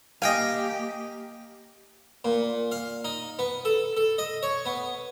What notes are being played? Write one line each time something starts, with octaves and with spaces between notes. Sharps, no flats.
A#3 G4 D#5 F5 G5 G#5
A#2
F5
D#4
B3
A4
A4
D#5
C#5
B3